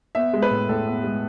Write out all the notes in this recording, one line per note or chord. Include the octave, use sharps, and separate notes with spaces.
B3 E5
G#3
B4
A2
A2 A4
B3
G#3